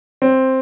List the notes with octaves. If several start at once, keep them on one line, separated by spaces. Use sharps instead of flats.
C4